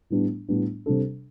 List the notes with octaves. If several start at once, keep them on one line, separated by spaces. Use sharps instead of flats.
A2 G3 B3 D4
A2 G3 B3 D4
C3 G3 D4 A4